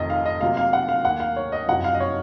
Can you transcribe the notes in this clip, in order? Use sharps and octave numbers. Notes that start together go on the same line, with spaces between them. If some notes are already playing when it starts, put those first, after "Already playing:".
Already playing: F1 F2 D#3 D#5
F5
D#5
C3 F#3 A#3 F4 F5
F5
F#5
F5
D#2 D#3 A#3 F#5
F5
C#5
D#5
F#1 F2 C3 F#3 F#5
F5
D#5
C#5